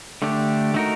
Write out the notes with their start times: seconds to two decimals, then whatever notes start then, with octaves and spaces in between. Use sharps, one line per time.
0.22 D3 A3 D4 G4
0.74 A3 D#4 F#4 A#4